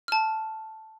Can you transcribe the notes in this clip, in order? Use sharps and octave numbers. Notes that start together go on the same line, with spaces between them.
A5 F6